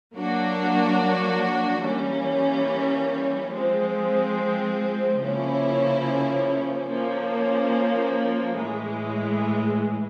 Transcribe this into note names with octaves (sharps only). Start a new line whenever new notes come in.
F#3 A#3 D4 F#4
E3 G3 A#3 C#4
F3 G#3 C4
C#3 F3 A#3 C#4 E4
F3 A#3 C#4
A2 E3 G#3